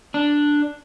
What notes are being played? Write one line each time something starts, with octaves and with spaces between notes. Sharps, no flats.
D4